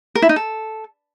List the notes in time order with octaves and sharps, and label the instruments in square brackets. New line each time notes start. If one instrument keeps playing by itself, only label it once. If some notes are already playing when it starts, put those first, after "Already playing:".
[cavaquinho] A#4
E4
D#4
A4